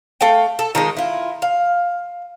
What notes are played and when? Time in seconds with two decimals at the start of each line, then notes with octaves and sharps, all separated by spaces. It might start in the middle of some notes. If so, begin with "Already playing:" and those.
0.21 A3 F5 G5
0.59 A4
0.75 D#3 F3 G#3 D#4
0.97 E4 F4
1.42 F5